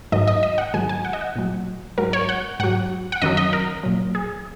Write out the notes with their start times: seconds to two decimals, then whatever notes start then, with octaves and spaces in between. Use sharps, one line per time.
0.12 G#2 D#3 F#3 D#5
0.28 D#5
0.43 D#5
0.58 F#5
0.74 G#2 D#3 F#3 G#5
0.89 G#5
1.05 F#5
1.13 D#5
1.21 F#5
1.36 A#2 F#3
1.98 G#2 F#3 A#4
2.13 C#5
2.29 F#5
2.60 G#2 F#3 F#5
3.12 F#5
3.22 F#2 D#3 F#3 D#5
3.37 D#5
3.53 A#4
3.83 A#2 F#3
4.15 G#4